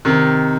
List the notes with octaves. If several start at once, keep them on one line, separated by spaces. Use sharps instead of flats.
C3 D#3